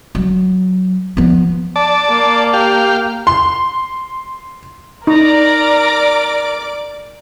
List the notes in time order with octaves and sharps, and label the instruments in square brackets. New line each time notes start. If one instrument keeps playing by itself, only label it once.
[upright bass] F#3
F3 B3
[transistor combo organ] D5 A5
[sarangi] A#3
[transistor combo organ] G4 F5
[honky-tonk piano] C6
[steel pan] D#4 [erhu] A#4 [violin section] D5 D6 [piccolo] A#5